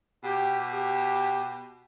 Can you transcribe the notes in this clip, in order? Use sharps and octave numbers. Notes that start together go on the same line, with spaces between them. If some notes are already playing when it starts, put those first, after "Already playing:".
B2 G4
G4